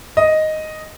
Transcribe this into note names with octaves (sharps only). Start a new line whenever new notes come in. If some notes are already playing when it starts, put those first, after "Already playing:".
D#5